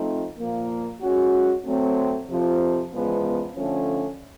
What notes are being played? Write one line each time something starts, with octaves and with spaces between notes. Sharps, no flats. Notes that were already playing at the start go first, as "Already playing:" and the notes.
Already playing: F3 A3 C4 D#4
A#2 F3 A#3
G#3 C#4 F#4
F#3 A3 C4
F2 C3 F3
E2 C#3 F3 G#3 B3
D3 F3 A3 C#4